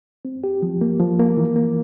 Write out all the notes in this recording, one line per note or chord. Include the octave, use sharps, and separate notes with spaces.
C4
G4
F3
A#3
F3
A#3
E3
A#3